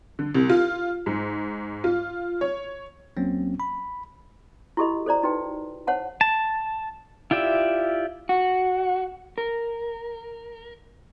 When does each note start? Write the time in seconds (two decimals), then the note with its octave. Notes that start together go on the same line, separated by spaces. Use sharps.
0.19 D3
0.35 C2
0.49 F4
1.06 G#2
1.84 F4
2.41 C#5
3.17 D#2 F#3 A#3 C4 C#4
3.60 B5
4.77 E4 F#4 G4 A4 D#5 B5
5.06 A4 C5 D5 A#5
5.23 D#4 F#4 B4 G5
5.87 C5 C#5 F#5 A5
6.21 A5
7.31 E4 F4 G4 D5 E5
8.29 F#4
9.38 A#4